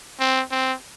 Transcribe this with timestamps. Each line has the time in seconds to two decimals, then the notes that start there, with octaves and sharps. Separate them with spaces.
0.20 C4
0.51 C4